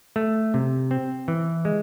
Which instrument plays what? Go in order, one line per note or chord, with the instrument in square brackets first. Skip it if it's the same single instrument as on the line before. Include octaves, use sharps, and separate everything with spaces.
[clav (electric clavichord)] A3
C3
C4
E3
G#3